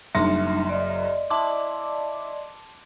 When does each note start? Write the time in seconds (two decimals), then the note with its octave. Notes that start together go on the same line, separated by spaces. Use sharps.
0.15 F#1 F#2 G3 D4 D#4 E5 C6 A#6
0.69 D5 D#5
1.30 E4 A5 C6 D6